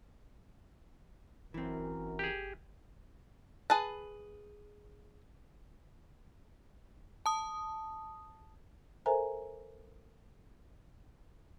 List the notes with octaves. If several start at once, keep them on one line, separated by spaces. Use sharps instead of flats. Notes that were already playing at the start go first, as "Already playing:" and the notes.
G1 F#2 E3 C4 A#4
G4 G#4
G#4 B4 A5
A5 D#6
A4 A#4 C5 E5 G#5 A#5